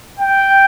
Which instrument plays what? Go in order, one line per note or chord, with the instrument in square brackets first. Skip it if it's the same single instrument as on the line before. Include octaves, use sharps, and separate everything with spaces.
[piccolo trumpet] G5